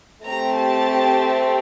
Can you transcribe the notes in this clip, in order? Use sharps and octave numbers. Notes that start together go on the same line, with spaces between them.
A3 C4 G4 A#5
A5